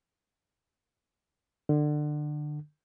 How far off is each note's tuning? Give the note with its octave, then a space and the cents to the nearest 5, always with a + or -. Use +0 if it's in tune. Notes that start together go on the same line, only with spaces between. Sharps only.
D3 +25